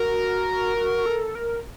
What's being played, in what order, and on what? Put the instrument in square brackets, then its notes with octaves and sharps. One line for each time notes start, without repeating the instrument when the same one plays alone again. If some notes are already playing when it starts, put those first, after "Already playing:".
Already playing: [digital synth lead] F#4 [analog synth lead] A#4
[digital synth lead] F#4
A4
A#4